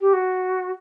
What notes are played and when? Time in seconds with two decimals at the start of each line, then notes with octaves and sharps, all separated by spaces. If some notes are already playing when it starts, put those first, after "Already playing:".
0.01 G4
0.13 F#4